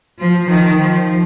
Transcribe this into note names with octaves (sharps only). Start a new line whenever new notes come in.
F3
D#3
F3